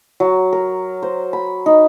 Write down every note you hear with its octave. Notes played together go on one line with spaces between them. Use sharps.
F#3
A#4
C5
B5
D#4